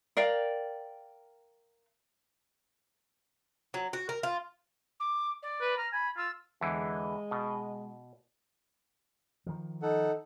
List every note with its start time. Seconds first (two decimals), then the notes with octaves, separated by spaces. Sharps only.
0.17 A#4 D5 F5 G5
3.74 F#3
3.93 F#4
4.09 A#4
4.23 F4
4.99 D6
5.42 D5
5.61 B4
5.77 A#5 F6
5.92 G#5 B5
6.17 F4 E6
6.61 E2 D3 E3 G#3
7.31 B2
9.46 D#3 F3
9.82 D#4 A4 F#5